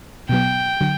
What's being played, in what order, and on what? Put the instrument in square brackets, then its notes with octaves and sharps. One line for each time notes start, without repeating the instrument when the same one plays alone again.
[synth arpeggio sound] B2 F#3 B3 [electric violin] G5
[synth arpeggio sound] D3 F#3